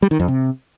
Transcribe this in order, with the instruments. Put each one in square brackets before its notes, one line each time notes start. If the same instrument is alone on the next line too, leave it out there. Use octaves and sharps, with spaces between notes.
[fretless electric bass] G3
D#3
F2
C3